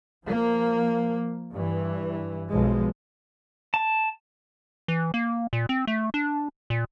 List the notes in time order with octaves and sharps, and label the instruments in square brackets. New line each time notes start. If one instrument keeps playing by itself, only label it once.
[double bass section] F3 A#3
G2 E3
B1 F3 G#3
[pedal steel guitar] A5
[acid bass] E3
A#3
A#2
C4
A3
D4
A#2